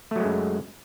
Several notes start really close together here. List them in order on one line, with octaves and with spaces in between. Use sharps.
A3 F#3 G#3 F#2